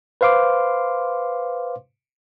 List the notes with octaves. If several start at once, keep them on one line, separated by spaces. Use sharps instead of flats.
B4 C5 F5 C6 D6